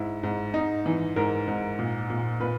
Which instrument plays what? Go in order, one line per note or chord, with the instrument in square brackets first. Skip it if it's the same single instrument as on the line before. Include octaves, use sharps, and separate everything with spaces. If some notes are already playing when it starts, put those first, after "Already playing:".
Already playing: [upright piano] G#2 E4
G#2
G#2 D#4
E3
G#2 A#4
G#2
A#2
A#2
A#2 B4